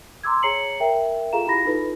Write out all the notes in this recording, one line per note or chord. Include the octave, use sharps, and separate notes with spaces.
A#5 C6 D6 E6 G#6
G#4 C#5 A#5 C7 C#7 F#7
A#4 E5 G5
F4 G#4 A4 F5 A#5 E7
E4 G4 B5 A#6
D#4 F4 A4 B4